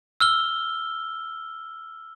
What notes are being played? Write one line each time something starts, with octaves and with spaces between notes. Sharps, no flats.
E6 F6 G7